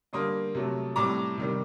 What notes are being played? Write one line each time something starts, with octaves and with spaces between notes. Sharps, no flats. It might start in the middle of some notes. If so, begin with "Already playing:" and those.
D3 G3 A#3 C6 D#6
C3 F#3 A3
A2 G3 C4 A#5 D6
C3 D#3 G3